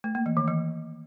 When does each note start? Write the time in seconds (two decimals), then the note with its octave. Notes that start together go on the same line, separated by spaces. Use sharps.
0.04 A3
0.15 A#3
0.26 E3
0.37 D#3
0.48 E3